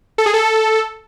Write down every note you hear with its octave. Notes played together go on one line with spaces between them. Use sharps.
A4
G#4
A4